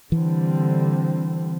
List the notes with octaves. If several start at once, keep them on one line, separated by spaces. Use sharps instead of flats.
D3 E3 G3 C4